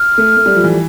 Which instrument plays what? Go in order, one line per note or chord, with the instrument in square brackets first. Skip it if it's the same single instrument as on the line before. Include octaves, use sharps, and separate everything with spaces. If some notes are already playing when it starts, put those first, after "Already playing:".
Already playing: [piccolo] F6
[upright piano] A3
A3
G3
F3
E3